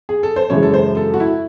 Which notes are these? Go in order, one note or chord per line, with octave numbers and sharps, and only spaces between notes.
G#4
A4
C5
F#2 C#3 E3 G#3 C#5
A4
C5
A4
F#4
E4